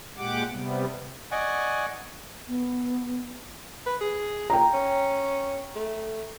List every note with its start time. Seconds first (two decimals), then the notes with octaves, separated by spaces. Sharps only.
0.17 A#2 G#3 G4 F#5 D6
0.50 C3 G3 B3
1.31 D5 D#5 F#5 G#5 C#6
2.48 B3
3.86 B4
4.01 G#4
4.50 A#2 G5 A#5
4.74 C#4
5.76 A3